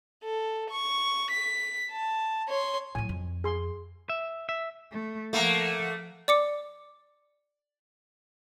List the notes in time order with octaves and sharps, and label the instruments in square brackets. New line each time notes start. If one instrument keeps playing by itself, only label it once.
[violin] A4
C#6
B6
A5
C#5 C6
[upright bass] A2 F#3 [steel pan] G#5
[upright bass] F2
[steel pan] G#4 C6
[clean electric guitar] E5
E5
[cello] A3
[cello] F3 F#5 [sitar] A3 A#3
[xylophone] D5 D6 C#7